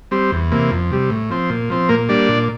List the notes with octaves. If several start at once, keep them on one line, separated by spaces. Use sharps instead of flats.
G3 C4
E2
C3 E3 A#3
F2
C3 G3
A2
F3 C4
A#2
F3 C4
A#2 A#3 A#4
G3 A#3 D4 D5
A#2